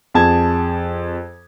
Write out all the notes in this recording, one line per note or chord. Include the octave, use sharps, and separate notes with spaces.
F2 G#4 A5 G#6